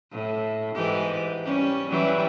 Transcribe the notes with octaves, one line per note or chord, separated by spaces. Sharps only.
A2
G#2 E3 G4
G3 C#4
E3 F#3 G3